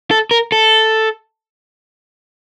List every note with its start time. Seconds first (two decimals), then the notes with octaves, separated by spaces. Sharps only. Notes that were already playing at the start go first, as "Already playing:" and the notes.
0.11 A4
0.31 A#4
0.52 A4